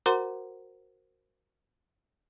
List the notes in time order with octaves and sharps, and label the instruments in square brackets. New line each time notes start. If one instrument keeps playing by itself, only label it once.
[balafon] F#4 A#4 C5 F#5 A#5 C6